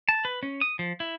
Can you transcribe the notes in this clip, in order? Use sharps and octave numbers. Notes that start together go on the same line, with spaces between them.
A5
B4
C#4
D#6
F3
E4